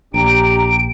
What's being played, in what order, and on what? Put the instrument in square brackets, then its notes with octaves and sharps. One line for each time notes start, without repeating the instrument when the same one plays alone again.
[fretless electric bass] A#1 [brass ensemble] D4 G4 [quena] A#5 [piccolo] D7